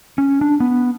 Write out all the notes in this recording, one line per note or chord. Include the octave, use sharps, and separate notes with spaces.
C#4
D4
B3